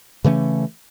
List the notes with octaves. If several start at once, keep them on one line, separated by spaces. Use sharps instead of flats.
C#3 E3 A3 C#4